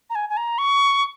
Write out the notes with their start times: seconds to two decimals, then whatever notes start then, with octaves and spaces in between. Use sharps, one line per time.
0.10 A#5
0.15 G#5
0.29 G#5
0.37 A#5
0.58 C#6